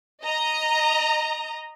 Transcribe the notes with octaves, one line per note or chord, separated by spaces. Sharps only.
D#5 A#5